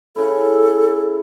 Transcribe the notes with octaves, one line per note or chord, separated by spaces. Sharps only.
C#3 E4 A4